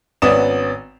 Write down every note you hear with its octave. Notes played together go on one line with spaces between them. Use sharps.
G#1 B3 C#4 D5 D#6 E7